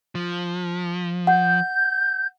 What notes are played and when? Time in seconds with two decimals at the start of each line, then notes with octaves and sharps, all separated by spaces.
0.15 F3
1.27 F#5 G6